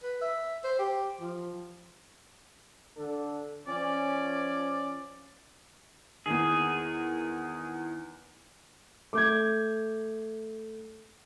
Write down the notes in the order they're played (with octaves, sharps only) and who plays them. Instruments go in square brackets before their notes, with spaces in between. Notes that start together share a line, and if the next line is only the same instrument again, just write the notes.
[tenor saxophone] B4
E5
C5
G4
F3
[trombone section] D3 D4 A4
[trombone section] F3 C#4 [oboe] D5
[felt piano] E2 D#3 [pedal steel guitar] G#4
[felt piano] A3 [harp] D6 G6 G#6